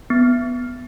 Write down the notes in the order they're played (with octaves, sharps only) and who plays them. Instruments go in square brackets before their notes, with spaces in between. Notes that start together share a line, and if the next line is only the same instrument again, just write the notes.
[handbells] B3